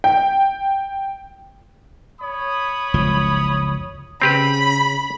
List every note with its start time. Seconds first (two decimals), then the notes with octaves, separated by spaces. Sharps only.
0.04 G5
2.22 C#5 B5 D#6
2.94 F#1 C#2 F3
4.22 C#3 C4 G4 B4 B5